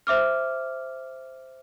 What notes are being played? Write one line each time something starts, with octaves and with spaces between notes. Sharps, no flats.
C5 E5 D6 F6